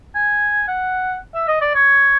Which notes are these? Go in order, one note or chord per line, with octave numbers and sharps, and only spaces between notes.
G#5
F#5
E5
D#5
D5
C#5